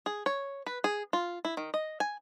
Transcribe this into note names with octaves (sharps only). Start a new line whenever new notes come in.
G#4
C#5
B4
G#4
F4
E4
D#3
D#5
G#5